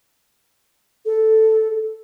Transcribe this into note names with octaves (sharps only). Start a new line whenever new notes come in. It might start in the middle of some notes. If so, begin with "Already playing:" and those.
A4